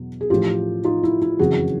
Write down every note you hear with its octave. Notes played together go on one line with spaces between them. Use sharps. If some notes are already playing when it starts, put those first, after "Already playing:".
Already playing: E2 B2 F#3
G#4
A1 A2 F3 F4 G4
D#4 F4
E4
E4
F#1 F2 C#3 E3 F#4 G#4